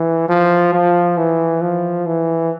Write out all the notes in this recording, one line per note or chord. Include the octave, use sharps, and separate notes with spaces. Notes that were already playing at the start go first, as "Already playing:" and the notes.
Already playing: E3
F3
F3
E3
F3
E3